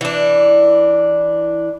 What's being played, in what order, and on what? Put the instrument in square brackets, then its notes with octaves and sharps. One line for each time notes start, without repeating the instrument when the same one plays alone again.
[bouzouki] E3 D4